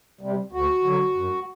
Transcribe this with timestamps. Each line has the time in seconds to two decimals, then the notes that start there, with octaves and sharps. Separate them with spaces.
0.21 C3 G3
0.52 D2 F#4
0.84 D3 F#3
1.15 F#2